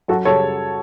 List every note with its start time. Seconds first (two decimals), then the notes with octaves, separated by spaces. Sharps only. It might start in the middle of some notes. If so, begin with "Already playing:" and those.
0.08 F#2 F#4 A4
0.25 C#3 G3 A4 C#5